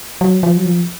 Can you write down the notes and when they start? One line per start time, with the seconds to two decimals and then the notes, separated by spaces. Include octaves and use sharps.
0.21 F#3
0.43 F3
0.57 F#3
0.65 F3